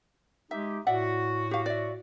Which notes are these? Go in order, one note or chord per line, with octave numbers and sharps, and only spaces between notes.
G#3 D#4 G4 E5
A2 F#4 D5 E5 F#5
G4 F5
D5 E5